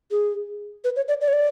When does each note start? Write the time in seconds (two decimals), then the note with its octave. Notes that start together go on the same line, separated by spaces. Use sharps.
0.11 G#4
0.84 B4
0.96 C#5
1.08 D5
1.21 D5
1.28 C#5
1.33 D5